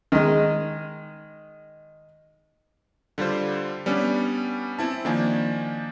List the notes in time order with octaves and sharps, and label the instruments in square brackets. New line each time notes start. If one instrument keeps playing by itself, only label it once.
[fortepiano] D#3 G#3
[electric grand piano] D3 G3 F4 C5
G3 B3 C#4 D4
C4 E4 A5
D#3 F3 A#3 D4 G#5